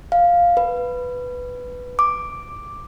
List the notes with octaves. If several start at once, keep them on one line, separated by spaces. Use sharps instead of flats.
F5
B4
D6